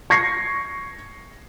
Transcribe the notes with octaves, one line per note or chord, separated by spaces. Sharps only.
C#6 G#6 A#6 C7 C#7